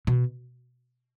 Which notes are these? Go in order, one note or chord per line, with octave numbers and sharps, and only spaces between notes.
B2